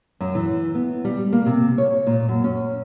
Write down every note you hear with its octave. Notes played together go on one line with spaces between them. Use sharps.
F#2
E3
B3
G3
A#3
C3
C#5
A#2
F#2
C#4